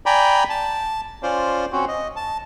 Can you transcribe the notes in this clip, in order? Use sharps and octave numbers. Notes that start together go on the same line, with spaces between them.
D5 G5 G#5 A#5 B5
A5
C#4 F4 C5 D5
C4 C#4 F#4
D#5
A5